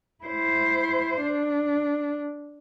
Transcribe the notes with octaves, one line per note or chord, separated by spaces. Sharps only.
E4 C5
D4